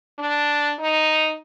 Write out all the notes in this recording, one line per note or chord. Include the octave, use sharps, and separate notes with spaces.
D4
D#4